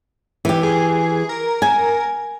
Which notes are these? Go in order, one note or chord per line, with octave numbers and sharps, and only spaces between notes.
E3 G4
G#4
A#4
G#5